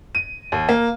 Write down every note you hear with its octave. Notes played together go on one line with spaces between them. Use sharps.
D#7
D#2
A#3